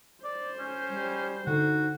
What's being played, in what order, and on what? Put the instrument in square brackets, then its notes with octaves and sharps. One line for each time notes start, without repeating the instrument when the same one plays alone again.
[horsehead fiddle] C5 [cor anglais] D5
[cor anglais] C#4
[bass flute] G3
[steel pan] D3 [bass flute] D#4 [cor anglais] F#4